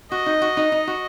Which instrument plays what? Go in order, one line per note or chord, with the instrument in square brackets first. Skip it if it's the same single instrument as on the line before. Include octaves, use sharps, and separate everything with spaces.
[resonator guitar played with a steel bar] F#4 [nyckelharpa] D#5
[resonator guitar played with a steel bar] D#4
F#4
D#4
D#4
F#4